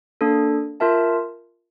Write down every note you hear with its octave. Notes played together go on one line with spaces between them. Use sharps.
A#3 D4 A4
F4 A#4 E5 A5